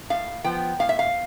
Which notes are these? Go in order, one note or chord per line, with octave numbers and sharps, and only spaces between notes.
A2 F5
F3 B3 G5
A2 F5
E5
F5